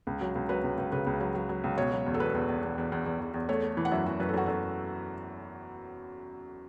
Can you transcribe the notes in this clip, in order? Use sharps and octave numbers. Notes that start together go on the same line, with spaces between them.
C#2
F#3
C#2
F#3 B4
C#2
C#2
C#3 B4
C#2
F#3
F#3
F#3
C#2
B2 C#5
F#3
E2
A4
E2 B4
E2
E2
E2
E2
E2
E2
E2
E2
A3 C#5
A3
E3
F#5
F#2 E5
E3 F#4
F#2 B4
A4
F#2 F#4
F#2 A4